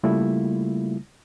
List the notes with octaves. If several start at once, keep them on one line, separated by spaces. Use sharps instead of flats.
C#3 G3 A3 A#3 E4 F4